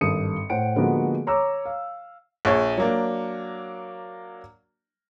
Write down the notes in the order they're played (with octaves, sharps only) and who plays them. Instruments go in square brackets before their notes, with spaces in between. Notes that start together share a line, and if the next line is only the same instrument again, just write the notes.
[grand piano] G#1 G2 A4 D#6 C#7
A2 C5 F#5 G5 D7
D3 F3 G#3 A#3 B3 F#4
C#5 A#5 D6 E6
F5
[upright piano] A#1 G#4 C#5
F#3 A#3 D4